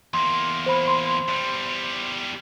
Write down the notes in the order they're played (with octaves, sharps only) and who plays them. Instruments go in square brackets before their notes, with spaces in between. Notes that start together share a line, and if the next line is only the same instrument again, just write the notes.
[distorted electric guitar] E2 A#3 [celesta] C6
[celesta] C5 B5
[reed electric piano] C6
[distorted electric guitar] E2 G3